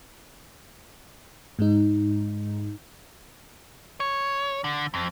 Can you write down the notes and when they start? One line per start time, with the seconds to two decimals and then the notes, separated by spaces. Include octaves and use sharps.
1.59 G#2 G#3 D#4
4.00 C#5
4.64 D3
4.94 F2